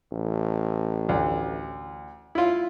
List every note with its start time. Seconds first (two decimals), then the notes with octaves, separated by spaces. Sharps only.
0.12 A1
1.09 D2
2.35 E4 F4